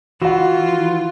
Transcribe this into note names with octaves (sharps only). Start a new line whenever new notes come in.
E3 F4 F#4 F#5